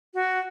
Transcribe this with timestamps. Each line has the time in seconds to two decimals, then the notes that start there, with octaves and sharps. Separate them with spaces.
0.14 F#4